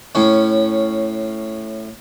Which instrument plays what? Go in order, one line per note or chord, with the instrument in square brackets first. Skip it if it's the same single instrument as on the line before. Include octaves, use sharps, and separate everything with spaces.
[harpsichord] A2 C#4